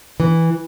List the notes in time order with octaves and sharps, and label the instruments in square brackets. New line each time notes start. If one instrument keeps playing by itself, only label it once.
[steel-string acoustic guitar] E3